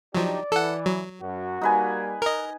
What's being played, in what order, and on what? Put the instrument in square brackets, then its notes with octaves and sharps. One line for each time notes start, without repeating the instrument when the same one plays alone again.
[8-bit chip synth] F3 F#3 [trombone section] D4 D#4 G4 [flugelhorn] D5
[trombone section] E3 [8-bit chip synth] A4 F#5
[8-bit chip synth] F#3
[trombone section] F#2 [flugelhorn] F#4
[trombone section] G3 A#3 [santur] D#4 B4 G#5
[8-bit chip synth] A#4 D#5